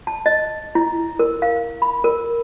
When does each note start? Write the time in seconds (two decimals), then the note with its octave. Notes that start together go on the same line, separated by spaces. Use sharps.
0.07 A5
0.26 D#5
0.75 E4
1.19 A#4
1.42 F5
1.82 B5
2.04 A#4